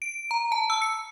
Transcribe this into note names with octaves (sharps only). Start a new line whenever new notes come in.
D7
A#5
A5
E6
C#7